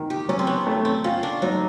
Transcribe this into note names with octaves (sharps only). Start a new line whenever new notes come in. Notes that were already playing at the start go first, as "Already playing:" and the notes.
Already playing: D#3
G4
F#3 C#4
C4
B3
A3
C4
C#4 F4
D4
F#3 D#4